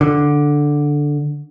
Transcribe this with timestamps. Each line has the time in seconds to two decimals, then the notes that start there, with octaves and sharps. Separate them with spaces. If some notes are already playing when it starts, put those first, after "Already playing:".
0.01 D3